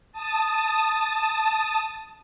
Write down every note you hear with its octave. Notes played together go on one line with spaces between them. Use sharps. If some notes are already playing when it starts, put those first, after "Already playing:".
A5 D#6